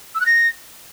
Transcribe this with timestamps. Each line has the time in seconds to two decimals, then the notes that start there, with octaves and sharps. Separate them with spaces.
0.15 E6
0.21 F#6
0.26 A#6